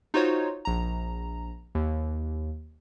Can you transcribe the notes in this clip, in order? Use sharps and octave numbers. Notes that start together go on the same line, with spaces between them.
D#4 F4 F#4 C5 C#5
A#1 A#5
D#2